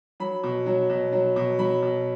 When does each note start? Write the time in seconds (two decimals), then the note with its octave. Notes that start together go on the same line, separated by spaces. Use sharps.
0.20 F#3 B5
0.43 B2
0.66 F#3
0.89 B2
1.12 F#3
1.36 B2
1.59 F#3 B5
1.82 B2